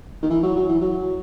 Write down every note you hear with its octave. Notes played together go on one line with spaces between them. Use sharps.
D#3
E3
F#3
F#3
E3
F#3